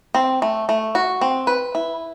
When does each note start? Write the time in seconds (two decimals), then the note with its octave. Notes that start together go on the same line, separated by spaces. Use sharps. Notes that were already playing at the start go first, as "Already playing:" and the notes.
0.15 C4
0.42 A3
0.69 A3
0.95 F#4
1.21 C4
1.47 B4
1.75 E4